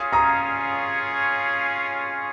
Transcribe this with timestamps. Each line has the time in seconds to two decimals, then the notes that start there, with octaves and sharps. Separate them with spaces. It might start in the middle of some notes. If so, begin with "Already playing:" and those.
Already playing: C#4 F4 G#4 C#5 F5 D#6
0.13 A#5 D#6